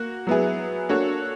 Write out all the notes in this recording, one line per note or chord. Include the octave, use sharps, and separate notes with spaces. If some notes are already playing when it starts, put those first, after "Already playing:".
Already playing: A#3 F#4
F#3 B3 E4 G#4
A#3 D4 F#4 A4 C#5